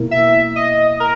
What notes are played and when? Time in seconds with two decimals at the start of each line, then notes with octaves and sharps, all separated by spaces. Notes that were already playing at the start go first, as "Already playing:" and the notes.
Already playing: B2 A#3 E4 A#4
0.11 E5
0.56 D#5
1.00 A#4